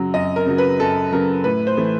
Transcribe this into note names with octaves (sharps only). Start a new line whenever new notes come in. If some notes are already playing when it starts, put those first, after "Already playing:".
Already playing: F#2 C#3 F#3
F#2 D#5
A#4
C#3 F#3
B4
F#2 A4
C#3 F#3 A#4
A2 B4
C5
E3 A3